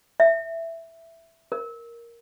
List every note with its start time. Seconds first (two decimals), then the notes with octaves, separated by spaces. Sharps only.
0.20 E5
1.52 A#4